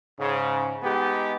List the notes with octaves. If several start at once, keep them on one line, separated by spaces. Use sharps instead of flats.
G#2 C#3
G#3 B3 D#4 G4